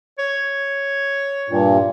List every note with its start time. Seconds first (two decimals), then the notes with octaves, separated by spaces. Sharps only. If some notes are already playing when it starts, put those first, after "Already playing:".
0.19 C#5
1.49 G2 A#2